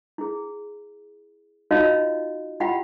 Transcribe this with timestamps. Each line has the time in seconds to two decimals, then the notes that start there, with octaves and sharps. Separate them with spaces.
0.18 E4 G#4
1.71 D#4 F4 F#4 C#5 D#5 F5
2.60 E4 F4 G4 F#5 G5 B5